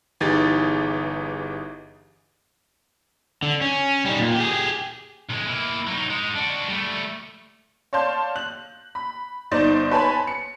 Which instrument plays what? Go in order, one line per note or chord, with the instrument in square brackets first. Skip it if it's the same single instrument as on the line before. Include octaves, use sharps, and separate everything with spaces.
[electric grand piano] G1 E3 D#4 G4 G#4 A6
[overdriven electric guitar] D3
C#4
G3 D#4
A#2
G4 G#4
[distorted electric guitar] B1 G#3
A#3 E4
F#3 D#4
G#3 D#4
D4 F#4
G3 A3
[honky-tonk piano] C#5 D5 F5 A5 C6 G6
F#6 F#7
B5
G1 D#4 C5 D5 A6
B4 C#5 G#5 A5 B5 C6
C#7